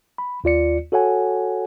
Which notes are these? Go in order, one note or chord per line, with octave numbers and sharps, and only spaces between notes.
B5
D#2 F4 D5 C#7
F#4 A4 C#5 F#5 G#5